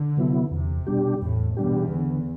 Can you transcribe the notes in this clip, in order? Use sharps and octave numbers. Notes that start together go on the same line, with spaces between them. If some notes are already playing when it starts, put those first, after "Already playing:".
Already playing: D3
C3 F#3 B3 E4
E2 C3
B2 G3 D4 G4
E2 A2
E2 B2 G3 D4 G4
D3